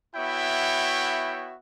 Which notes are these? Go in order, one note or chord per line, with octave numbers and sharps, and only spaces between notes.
B3 E4 F#4 C#5 E5 G5